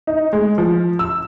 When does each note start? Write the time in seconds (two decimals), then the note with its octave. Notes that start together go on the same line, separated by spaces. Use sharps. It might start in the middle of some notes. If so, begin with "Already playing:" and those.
0.07 D#4
0.33 G#3
0.58 F3
0.99 E6